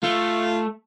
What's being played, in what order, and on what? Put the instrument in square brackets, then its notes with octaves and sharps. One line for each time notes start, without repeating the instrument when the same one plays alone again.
[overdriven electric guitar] A3 [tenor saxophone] F4